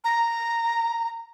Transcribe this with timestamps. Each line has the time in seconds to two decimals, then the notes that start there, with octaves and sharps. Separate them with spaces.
0.04 A#5